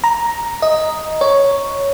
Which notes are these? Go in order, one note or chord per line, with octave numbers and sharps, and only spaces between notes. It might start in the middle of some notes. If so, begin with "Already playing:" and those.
A#5
D#5
C#5